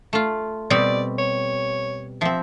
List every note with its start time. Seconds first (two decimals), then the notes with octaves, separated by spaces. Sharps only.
0.13 A3 F4
0.70 B2 G3 C4 D5
1.19 C#5
2.21 F3 C4 E5